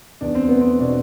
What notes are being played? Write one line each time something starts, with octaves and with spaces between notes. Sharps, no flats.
E2 D4
C4
A3 B3
C4
B2 D4